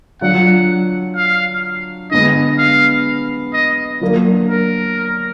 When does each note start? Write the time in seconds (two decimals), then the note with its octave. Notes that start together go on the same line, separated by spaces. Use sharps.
0.21 F#3 D4 F4 F#5
1.16 F5
2.11 D3 G#3 B3 D#5
2.59 F5
3.54 D#5
4.01 F#3 A#3 D4
4.49 A#4